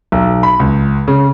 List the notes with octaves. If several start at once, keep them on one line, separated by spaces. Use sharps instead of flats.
B1
B5
C#2
C#3